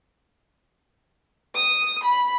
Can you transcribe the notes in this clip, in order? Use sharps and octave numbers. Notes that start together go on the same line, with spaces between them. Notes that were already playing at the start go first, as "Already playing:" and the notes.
D#6
B5